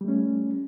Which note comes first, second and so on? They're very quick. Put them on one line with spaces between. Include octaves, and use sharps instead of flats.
G3 A3 C#4